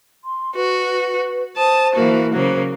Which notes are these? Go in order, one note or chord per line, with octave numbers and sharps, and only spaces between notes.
C6
F#4 B4
C5 A5 D#6
E3 A#3 F#4
C#3 F#3 A#3 C5